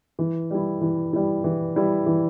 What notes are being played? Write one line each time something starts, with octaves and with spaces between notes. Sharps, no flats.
E3
G3 E4
E3
G3 E4
E3
G3 E4
E3